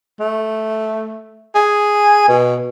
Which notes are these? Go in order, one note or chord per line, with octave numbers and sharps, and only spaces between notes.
A3
G#4
B2